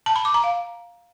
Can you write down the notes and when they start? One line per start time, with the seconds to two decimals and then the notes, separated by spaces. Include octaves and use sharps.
0.06 A5
0.16 B5
0.25 D6
0.34 A#5
0.44 F5